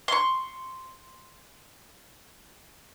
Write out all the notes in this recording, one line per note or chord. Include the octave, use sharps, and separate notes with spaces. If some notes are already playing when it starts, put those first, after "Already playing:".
C6 C#6